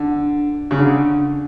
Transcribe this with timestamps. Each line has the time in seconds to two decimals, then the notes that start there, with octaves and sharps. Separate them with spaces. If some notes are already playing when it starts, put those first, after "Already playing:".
Already playing: D3
0.71 C#3
0.78 D3